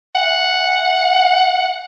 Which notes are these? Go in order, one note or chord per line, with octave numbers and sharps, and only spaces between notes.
F#5